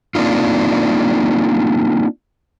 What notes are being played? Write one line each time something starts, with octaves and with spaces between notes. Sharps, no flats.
A#3 C4 D4 D#4 F4